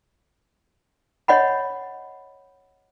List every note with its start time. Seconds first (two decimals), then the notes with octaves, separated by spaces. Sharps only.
1.28 C#5 D#5 F#5 B5